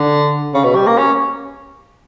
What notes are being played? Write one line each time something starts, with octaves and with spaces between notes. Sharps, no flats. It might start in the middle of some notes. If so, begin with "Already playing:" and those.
Already playing: D3
C#3
B2
G3
A#3
C#4